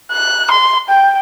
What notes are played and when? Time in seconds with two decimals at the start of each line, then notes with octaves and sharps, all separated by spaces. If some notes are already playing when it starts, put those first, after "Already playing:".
0.12 F#6
0.51 C6
0.89 G5